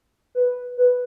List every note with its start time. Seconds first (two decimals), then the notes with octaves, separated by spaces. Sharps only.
0.35 B4
0.77 B4